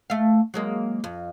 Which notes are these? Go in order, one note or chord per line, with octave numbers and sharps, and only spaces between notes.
A3 F5
F#3 G#3 A#3
F2